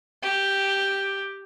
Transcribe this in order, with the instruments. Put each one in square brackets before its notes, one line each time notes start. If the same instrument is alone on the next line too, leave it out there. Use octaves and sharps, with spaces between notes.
[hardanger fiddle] G4